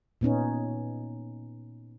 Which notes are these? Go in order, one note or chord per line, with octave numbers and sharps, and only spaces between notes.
A#2 B3 C#4 D#4